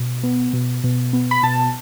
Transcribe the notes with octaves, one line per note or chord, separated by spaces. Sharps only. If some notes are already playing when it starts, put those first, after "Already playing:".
Already playing: B2
B3
B2
B2
B3
B5
B2 A5